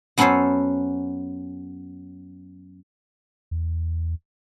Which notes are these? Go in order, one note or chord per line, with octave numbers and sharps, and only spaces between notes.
F#2 B3 C#4 A4 C5 C#5
E2